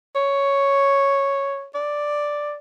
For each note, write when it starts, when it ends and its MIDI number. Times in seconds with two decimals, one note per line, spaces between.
0.15 1.67 73
1.75 2.57 74